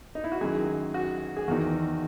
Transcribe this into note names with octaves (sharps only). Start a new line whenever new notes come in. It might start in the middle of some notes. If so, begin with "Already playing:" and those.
D#4
E4
F#4
F#2 D#3 G#4
F#4
G#4
E2 D#3 F#4